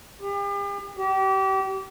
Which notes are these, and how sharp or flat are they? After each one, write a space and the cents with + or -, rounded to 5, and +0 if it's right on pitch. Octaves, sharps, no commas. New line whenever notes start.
G4 +40
G4 -30